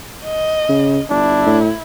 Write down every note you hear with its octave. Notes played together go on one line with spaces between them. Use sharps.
D#5
C#3
G1 D4 E4
A2